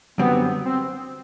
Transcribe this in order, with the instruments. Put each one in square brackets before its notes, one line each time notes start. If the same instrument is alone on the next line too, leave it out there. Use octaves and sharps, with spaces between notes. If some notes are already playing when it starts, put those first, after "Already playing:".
[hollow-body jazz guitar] F#2 D3 G3 C4 [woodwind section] B3
[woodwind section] C4